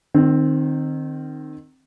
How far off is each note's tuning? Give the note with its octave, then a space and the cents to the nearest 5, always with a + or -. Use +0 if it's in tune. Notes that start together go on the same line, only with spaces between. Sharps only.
D#3 -25 C4 +5